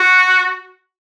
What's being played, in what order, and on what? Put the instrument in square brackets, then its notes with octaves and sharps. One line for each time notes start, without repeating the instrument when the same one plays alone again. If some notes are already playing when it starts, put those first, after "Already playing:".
Already playing: [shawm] F#4